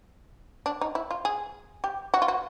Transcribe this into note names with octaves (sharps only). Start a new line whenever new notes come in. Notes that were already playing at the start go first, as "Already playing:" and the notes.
D4
D#4
E4
F4
G#4
G4
F#4
F4
F#4